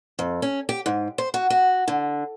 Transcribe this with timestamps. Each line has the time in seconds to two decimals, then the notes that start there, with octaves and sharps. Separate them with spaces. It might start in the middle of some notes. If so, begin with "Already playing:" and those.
0.19 F2
0.42 C#4
0.69 G4
0.86 G#2
1.18 C5
1.34 F#4
1.50 F#4
1.88 D3